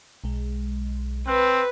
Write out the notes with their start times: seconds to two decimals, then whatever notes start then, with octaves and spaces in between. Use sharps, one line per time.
0.24 B1 G#3
1.27 C4 B4 F#6